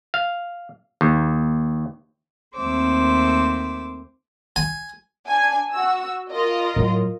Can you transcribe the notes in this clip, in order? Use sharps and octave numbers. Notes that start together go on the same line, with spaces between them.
F5
D#2
D#2 A3 C4 C5 D6 E6
G#5
D4 G#5
F#4 E6
F4 A#4 D#5
A2 F#3